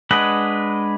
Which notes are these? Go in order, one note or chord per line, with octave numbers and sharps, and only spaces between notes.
G#3 D4 B4 D#5 F#5